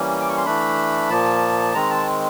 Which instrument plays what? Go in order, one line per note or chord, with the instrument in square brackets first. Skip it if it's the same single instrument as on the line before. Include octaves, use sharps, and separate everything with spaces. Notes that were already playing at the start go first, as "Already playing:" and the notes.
Already playing: [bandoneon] E3 G3 A#3 C#4
D6
C#6
C6
E3 A3 D4 B5
A#2 F3 A#3 A5
D#3 G#3 C4 A#5
A5